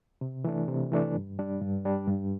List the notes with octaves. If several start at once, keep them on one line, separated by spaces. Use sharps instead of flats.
C3
E3 A3 D4
C3
E3 A3 D4
G2
G3 D4
G2
G3 D4
G2